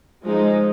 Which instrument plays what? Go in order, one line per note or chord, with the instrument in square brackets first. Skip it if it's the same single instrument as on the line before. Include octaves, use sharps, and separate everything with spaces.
[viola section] F3 G#3 D#4